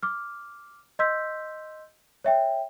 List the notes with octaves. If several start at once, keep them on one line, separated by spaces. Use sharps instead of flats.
D6 F6
D#5 C6 E6 G6 B6
C#5 E5 G5